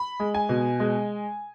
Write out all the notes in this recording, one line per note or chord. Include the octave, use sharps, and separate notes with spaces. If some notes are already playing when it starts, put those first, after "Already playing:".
Already playing: B5
G#3
G#5
B2
G#3